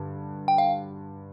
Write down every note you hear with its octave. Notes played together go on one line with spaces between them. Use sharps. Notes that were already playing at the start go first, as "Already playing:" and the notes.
Already playing: G2 D3
G5
F5